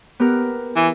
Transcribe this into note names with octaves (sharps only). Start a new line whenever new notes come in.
B3 G4 A#4
E3